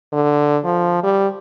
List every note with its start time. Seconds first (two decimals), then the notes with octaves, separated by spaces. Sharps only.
0.13 D3
0.64 F3
1.03 G3